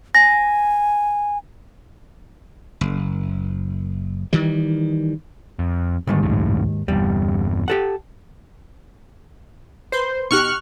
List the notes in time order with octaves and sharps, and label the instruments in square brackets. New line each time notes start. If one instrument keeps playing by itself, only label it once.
[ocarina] G#5 [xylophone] A#6
[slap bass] F#1
D#3 E3 G3
[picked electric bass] F2
[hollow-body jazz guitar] D#2 G#2 D#3 [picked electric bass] D3 G3
[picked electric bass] C#2 F#2 A2
[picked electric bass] G1 E2 [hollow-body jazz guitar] G3
[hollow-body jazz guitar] G4 A4 F#5
[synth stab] B4 C6 G6 [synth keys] C5
[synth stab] B2 D#4 G4 [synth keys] C#6 F6 F#6